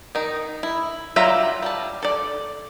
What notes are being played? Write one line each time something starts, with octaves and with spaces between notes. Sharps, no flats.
D#3 D#4
E4
F#3 G3 F4 E5 A#5
G3 A5
A4 D5